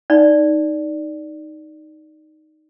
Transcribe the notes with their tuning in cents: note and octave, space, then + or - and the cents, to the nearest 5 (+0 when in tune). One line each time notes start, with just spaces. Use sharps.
D#4 +0 D5 +0